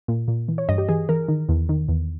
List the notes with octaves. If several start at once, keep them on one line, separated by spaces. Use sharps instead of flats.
A#2
A#2
E3
C#5
G2 D#5
G4
E3 G#4
E3 A#4
D#3
E2
D#3
E2